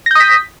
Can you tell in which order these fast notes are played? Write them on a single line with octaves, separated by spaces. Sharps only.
A#6 G6 D#6 B6